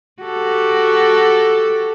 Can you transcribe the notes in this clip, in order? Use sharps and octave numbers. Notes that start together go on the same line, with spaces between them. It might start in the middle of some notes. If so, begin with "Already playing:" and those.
F#4 G4 A4